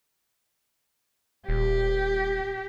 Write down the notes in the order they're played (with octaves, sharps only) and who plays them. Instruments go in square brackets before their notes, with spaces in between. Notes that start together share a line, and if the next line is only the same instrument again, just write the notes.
[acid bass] D#1 [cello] G4